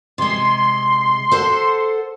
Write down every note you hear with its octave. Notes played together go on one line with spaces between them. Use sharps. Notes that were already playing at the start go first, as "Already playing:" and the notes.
C3 G#3 C6
A4 C5 F#5